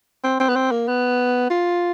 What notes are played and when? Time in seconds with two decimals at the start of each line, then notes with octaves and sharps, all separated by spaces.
0.24 C4
0.40 C4
0.49 B3
0.56 C4
0.71 A#3
0.88 B3
1.51 F4